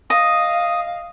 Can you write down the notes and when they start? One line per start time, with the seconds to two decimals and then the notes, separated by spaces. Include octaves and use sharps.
0.10 D#5 F5 D#6